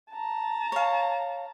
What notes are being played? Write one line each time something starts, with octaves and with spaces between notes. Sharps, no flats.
A5 A#5
C#5 F5